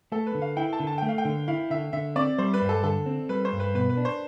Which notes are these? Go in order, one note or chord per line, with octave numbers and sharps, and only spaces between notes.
A3 A4
B4
D3
F5
E4 G5
A5
D3
A5
A3 G5
F5
G5
D3
E4 F5
D3 E5
D3 E5
C4 D5
G3 C5
B4
G2
A4
D3 A4
C4
G3 B4
C5
G2
B4
B2 B4
B4
D4
C5